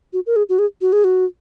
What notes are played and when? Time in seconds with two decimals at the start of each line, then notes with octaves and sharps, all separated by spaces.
0.13 F#4
0.26 A#4
0.36 G#4
0.49 F#4
0.59 G#4
0.81 F#4
0.93 G#4
1.04 F#4